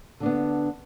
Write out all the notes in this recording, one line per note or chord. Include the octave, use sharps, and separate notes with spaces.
D3 B3 D4